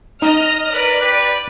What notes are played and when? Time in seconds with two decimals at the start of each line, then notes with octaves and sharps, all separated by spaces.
0.22 D#4 D#5 F6 A#6
0.72 A#4 B4 D5
1.01 G4 B4